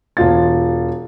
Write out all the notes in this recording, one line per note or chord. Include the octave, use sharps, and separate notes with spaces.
E1 F4 A6